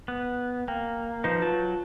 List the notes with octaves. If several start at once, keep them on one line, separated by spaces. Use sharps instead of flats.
B3
A#3 G5
F3 D#4 B4 G6
F#3 F4 A5